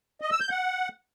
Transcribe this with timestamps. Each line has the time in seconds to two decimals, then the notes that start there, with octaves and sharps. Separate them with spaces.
0.21 D#5
0.31 E6
0.40 G6
0.50 F#5